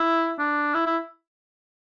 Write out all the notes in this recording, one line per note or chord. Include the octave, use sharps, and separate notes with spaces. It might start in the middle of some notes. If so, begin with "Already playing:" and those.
Already playing: E4
D4
E4
E4